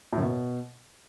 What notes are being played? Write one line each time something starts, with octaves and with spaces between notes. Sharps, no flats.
A2
F#2
B2